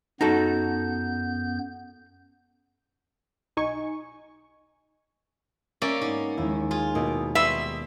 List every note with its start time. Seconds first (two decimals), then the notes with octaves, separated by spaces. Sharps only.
0.21 F#2 B3 D#4 F#4 A4 G6
3.57 B1 D#4 G#5 C#6
5.82 A#3 C#4 D5 E5
6.01 G#2 B3 C#4 D#4
6.38 D#2 G#3 E4
6.71 F4 G#4
6.95 B2 A#3 E4 D#5
7.35 B2 G3 E5 B5 C6